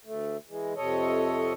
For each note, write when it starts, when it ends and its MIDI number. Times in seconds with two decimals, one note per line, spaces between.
0.05 0.37 38
0.05 0.37 57
0.49 0.74 52
0.49 0.74 56
0.76 1.53 41
0.76 1.53 48
0.76 1.53 69
0.76 1.53 73
0.76 1.53 75